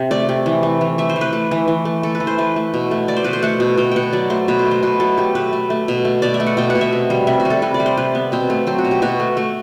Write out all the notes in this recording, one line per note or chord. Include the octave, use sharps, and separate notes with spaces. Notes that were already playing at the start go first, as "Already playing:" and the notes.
Already playing: C3
A3 D5
C3
E3
A3
E3
A3 E5
C5
E3
B4
A3
E3
E3
A3
A3 A4
B4
E3
C5
A3 B4
A3
B2
A3
A3 D5
C5
B2 B4
C5
A3 F#5
B2
B2 G5
B2 F#5 G5
F#3 D5
A3 C5
B2 B4
C5
A3
C5
B2 B4
F#3 A4
A3 G4
B2 B4
A3
A3
B2
A3
B2 D5
E5
A3
F#5
B2 G5
F#5
B2
E5
C3
G3
C3 E5
F#4
G3
A4
C3 B4
D5
G3
C5
C3 B4
B3
B2 C4
A3
F#3 C4
F#4
B2
G4
B2 F#4
A3
A3